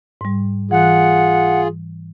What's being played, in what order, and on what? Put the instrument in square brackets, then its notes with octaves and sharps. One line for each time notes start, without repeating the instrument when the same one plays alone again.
[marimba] G#2 G3
[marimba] E3 F#6 [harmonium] F4 G#4 [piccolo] F#5